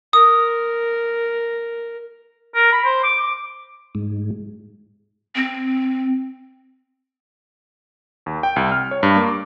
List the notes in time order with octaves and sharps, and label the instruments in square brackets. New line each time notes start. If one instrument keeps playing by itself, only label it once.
[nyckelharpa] A#4 [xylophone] D#6
[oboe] A#4
B5
C5
D6
D6
[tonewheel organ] G#2
[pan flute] C4
[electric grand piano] D#2
G5
C2
F6
C#5
G2
A#3
D6